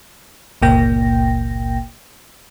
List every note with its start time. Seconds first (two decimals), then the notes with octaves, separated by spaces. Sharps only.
0.62 G1 C#2 A#2 A#3 G5 A#6